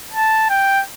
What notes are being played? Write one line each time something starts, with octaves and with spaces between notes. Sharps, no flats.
A5
G5